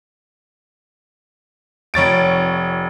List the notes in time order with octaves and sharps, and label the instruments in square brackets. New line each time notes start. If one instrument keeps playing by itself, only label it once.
[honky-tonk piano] F1 C#5 A6 D7